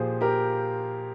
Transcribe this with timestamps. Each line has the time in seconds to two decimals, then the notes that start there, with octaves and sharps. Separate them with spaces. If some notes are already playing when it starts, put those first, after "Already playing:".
Already playing: A#2 F3 G4 G#4 C5
0.21 G4 A#4